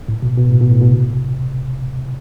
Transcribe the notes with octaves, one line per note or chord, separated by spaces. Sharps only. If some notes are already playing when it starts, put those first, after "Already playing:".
A2
B2
B2
A2
B2
A2
B2
C3